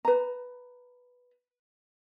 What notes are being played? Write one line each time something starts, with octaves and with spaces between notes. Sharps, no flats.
B4 A#5